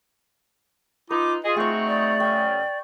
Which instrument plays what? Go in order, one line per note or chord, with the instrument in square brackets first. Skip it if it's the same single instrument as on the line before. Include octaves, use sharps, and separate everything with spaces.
[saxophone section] D#4 [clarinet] F4 [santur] B4 [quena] D6
[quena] F4 [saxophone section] G#4 [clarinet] D#5
[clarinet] A3 [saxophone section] C4 D#4 F#4 [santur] G#4 C#6
[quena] D5
[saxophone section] F#2 C#3 [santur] G5 C#6